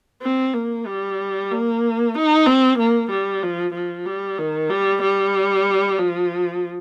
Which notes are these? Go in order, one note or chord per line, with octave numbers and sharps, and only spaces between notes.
C4
A#3
G3
A#3
D#4
C4
A#3
G3
F3
F3
G3
D#3
G3
G3
F3